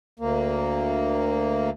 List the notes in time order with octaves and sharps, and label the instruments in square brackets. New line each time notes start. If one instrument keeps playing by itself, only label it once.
[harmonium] D2 A#3